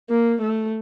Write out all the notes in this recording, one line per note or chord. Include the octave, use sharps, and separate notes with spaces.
A#3
A3